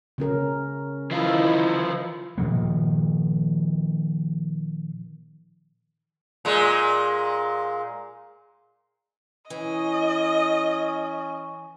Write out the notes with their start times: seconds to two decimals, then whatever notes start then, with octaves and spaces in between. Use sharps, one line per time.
0.18 C#3 C#4 A#4
1.11 D#3 E3 E4 F4 D#5
2.38 A#2 D#3 F3 A#3
6.45 A#2 G#3
9.50 E3 C#4 D#5